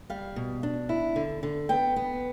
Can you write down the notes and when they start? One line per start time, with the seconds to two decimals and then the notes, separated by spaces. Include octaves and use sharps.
0.10 G3 F5
0.36 B2
0.63 D4
0.89 E4
1.16 D3
1.43 D3
1.69 B3 G5
1.96 B3